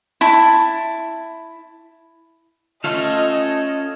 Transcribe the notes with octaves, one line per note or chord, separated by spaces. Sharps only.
E4 A5
A3 C#4 F4 A4 D#5 F5